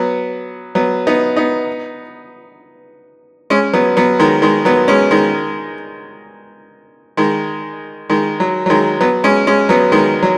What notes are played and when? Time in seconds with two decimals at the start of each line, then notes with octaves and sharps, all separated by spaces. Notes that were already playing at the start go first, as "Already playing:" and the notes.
Already playing: F#3 B3
0.75 F#3 B3
1.07 B3 D#4
1.37 B3 D#4
3.50 G#3 C#4
3.73 F#3 B3
3.97 F#3 B3
4.19 D#3 G#3
4.42 D#3 G#3
4.65 F#3 B3
4.88 G#3 C#4
5.11 D#3 G#3
7.17 D#3 G#3
8.10 D#3 G#3
8.40 F#3
8.66 F#3
8.70 D#3 G#3
9.01 F#3 B3
9.24 G#3 C#4
9.47 G#3 C#4
9.69 F#3 B3
9.92 D#3 G#3
10.23 F#3